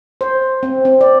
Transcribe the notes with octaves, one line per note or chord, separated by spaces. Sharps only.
C5
C4
C4
D5